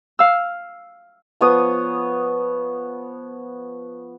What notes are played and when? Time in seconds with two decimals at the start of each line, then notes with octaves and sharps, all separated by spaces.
0.19 F5 E6
1.41 F3 B3 C#5 D#6